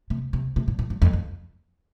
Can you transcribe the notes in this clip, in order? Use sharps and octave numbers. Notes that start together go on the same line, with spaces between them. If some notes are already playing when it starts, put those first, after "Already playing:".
C3
C3
C3
A2
A2
G2
F2
F2